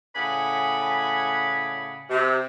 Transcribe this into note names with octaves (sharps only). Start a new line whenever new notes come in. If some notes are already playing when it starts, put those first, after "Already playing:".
A2 C#3 D5 F#5 G#5 B5
C3